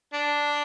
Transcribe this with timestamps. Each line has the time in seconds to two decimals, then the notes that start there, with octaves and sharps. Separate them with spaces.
0.13 D4